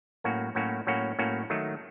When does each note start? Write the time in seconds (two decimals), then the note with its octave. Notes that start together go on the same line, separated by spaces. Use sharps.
0.24 A2 F#3 A#3 C#4 F#4
0.55 A2 F#3 A#3 C#4 F#4
0.87 A2 F#3 A#3 C#4 F#4
1.19 A2 F#3 A#3 C#4 F#4
1.50 D#3 F#3 A3 D#4